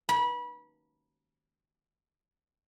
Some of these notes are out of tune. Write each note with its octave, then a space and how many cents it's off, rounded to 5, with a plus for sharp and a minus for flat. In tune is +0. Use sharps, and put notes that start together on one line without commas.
B5 -25